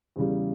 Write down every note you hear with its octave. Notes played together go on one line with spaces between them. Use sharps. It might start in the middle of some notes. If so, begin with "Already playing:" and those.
E2 C#3 G3